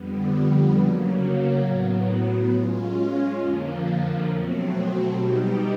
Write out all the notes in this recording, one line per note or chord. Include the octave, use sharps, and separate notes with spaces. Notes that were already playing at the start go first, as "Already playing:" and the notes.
Already playing: F2 D3 G3 B3
C#3 F#3 A#3
A2 F#3 B3
G#3 C#4 F4
F2 D3 F3 A#3
B2 F#3 A3 C4
B2 G3 B3 D#4 G4